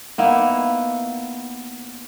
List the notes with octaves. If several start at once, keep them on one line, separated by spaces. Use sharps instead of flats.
A#3 B3 D#4 E4